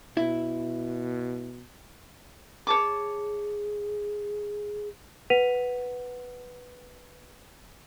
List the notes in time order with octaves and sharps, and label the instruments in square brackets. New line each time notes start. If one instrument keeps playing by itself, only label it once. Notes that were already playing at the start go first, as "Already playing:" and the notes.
[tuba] B2 [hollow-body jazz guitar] E4
[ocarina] G#4 [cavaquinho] C#5 A5 D6
[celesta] B4 F#5 B6 D#7 F7